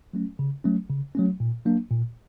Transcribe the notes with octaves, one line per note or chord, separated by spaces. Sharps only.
F#3 A3 C#4
C#3
F#3 A3 C#4
C#3
F#3 A3 C#4
A#2
F#3 A#3 D4
A#2